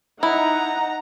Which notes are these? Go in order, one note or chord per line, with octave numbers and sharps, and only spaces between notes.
D#4 E4 F#5 A#5